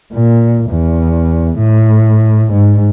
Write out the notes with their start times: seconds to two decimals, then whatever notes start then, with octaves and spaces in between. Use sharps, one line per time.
0.13 A#2
0.70 E2
1.58 A2
2.53 G#2